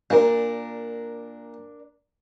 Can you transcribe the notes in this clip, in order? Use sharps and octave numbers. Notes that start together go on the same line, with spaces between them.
A#2 D4 A#4